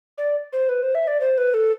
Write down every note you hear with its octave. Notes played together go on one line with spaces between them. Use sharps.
D5
C5
B4
C5
E5
D5
C5
B4
A4